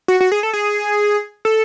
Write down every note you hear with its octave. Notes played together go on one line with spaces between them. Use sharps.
F#4
F#4
G#4
A4
G#4
A4